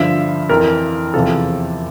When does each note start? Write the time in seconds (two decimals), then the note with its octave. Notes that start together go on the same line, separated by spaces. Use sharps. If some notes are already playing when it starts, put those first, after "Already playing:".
Already playing: G2 D3 F3 E5
0.49 F2 E3 A#4
1.14 E2 C3 F3 A4